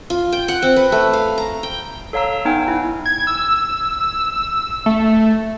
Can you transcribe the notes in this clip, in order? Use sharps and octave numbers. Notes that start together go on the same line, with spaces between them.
F4
G5
F#5
C4
B4
A3
F5
A#5
G5
A4 C#5 F5 A#5 E6
B3 D#4 G5 G#5
E4
G#6
E6
A3